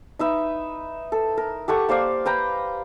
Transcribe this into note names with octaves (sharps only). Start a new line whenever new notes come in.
D#4 B4 E5
A4
A#4
G4 A4 F#5 C#6
A#3 C5 D5 F5
B4 G5 A#5